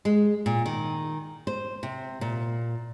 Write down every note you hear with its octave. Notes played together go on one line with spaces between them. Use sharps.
G#3
A#2
D#3
C5
C3
A#2